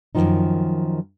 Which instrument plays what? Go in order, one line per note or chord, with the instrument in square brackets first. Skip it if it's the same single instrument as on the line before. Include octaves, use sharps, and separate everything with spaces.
[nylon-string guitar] F#2 A#2 D#3 F3 D#4